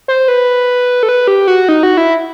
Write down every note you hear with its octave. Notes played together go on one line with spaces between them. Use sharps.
C5
B4
A4
B4
G4
F#4
D#4
F#4
E4